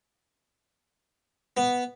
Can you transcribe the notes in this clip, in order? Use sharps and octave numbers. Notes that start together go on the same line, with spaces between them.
B3